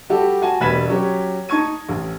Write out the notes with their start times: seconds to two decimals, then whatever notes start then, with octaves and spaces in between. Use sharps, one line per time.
0.10 G3 F#4 G4 A4
0.42 F#4 G#5 A5
0.60 E1 G3 B4 G#6 B6 E7
0.88 F#3 C#4 G4
1.49 D#4 A5 C#6 G#6 D#7
1.89 A1